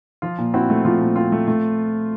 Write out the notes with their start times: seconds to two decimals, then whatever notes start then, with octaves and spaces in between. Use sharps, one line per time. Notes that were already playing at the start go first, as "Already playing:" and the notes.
0.22 F3 F4
0.38 A#2
0.54 C4 E4 F#4
0.70 A3
0.85 F3 F4
1.01 A#2
1.16 C4 F4
1.32 A3
1.48 A3